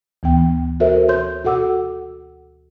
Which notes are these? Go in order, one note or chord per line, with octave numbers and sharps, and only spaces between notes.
D2 E3 B3 G5
F#4 A4 A#4 C5 E5
C#5 C6 G6
F#4 A4 F#5 D6 E6